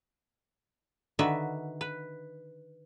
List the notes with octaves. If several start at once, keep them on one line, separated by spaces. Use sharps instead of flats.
D3 D#3 F#4 B4 E5
B4